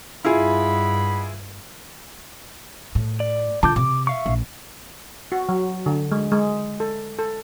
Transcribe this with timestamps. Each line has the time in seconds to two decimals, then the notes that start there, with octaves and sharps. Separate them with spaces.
0.25 G2 E4 F4 G#4 D#5 F#5 B5
2.95 A2
3.20 D5
3.63 D3 F4 A5 D6 G6
3.76 C3 D6
4.07 E5 F5 C#6
4.26 A#1
5.32 F#4
5.49 F#3
5.86 D3
6.12 G#3
6.32 G#3
6.80 A4
7.19 A4